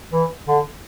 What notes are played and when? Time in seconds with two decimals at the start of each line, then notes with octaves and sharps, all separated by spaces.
0.13 E3
0.48 D3